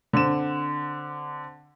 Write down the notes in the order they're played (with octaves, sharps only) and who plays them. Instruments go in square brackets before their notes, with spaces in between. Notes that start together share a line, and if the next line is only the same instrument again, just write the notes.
[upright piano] D3 C4 E7